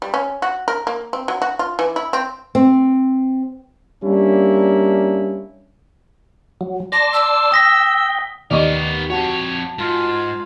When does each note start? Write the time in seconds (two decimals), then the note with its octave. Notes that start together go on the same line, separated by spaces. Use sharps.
0.02 G3
0.14 C#4
0.42 F#4
0.68 A#4
0.87 A#3
1.13 C4
1.28 F#3
1.42 F#4
1.59 F4
1.79 E3
1.96 E4
2.13 C4
2.55 C4
4.03 G3 A#3 C#4 D4 E4
6.61 F#3
6.92 D5 A5 C6 A#6
7.13 E6
7.52 G5 D#6 A#6 B6
8.51 D#2 B3 A#4 D5 D#5 C#6 D#7
9.10 F2 F#4 C#5 F#5 A5
9.78 G#2 F4